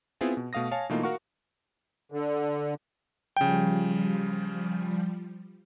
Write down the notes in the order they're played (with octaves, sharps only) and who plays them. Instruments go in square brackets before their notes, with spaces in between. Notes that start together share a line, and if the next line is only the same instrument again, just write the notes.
[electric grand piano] B3 C4 E4 F4 G#4 G#5
B2
B2 A3 F5 D#6 A#6
C#5 F5 G#5 A5
B2 E3 A3 A#3 D#4 F4
F#4 A#4 F5 F#5 C#6
[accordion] D3
[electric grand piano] C#3 G5 [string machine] F3 G3